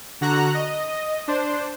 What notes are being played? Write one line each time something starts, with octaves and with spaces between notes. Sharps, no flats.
D3 F#4 A#5 F#6
D#5
D4 C5